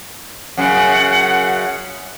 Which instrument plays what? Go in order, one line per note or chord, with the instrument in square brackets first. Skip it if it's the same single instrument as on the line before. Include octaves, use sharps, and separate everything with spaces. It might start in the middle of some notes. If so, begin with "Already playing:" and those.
[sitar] F#2 C#3 [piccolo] F#5